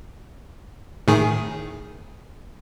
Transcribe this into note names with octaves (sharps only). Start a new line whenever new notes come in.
A2 D#3 G#4